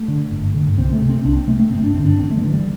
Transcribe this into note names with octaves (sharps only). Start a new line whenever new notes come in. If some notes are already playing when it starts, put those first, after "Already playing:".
Already playing: A3
D3
G1
G2 D3
C2 C4
A3
C3
C4
C2 D4
C4
C3 A3
A3
G1 C4
D4
G2 D3 C4
D4
A1 C4
A3
G3
G2 D3 E3
G3